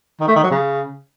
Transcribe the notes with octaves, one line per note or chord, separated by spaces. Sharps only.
D#3
A3
D#3
F#3
C#3